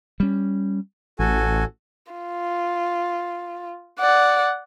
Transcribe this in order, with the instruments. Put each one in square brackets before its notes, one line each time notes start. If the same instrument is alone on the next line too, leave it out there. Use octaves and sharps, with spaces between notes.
[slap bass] G3 C#4
[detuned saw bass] A1 [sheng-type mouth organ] F#4 A4 G#5
[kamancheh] F4
D5 F#5